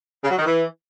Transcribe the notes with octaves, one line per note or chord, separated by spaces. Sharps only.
C#3
F#3
D#3
E3